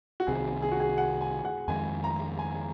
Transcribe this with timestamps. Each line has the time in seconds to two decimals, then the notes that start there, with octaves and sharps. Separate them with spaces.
0.20 F#4
0.27 C2 C3 D#3 G#4
0.62 G#4
0.72 F#4
0.80 G#4
0.98 F#5
1.21 G#5
1.45 F#5
1.68 F2 D#3 G#3 G#5
2.04 A#5
2.39 G#5